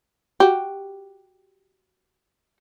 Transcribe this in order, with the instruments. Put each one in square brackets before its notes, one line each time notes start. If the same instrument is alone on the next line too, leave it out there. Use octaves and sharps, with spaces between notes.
[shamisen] F#4 G4